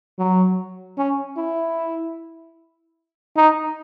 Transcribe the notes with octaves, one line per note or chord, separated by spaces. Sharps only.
F#3
C#4
E4
D#4